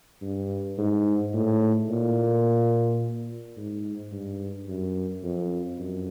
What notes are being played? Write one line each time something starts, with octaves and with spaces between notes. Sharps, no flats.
G2
G#2
A2
A#2
G#2
G2
F#2
F2
F#2